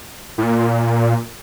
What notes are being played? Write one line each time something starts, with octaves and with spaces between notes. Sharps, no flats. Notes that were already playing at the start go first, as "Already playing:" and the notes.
A2
A#2